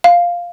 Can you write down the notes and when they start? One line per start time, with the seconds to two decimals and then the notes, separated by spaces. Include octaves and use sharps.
0.04 F5